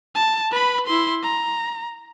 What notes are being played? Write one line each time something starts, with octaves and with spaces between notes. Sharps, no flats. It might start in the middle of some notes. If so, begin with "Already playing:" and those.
A5
B4 B5
E4 C6
A#5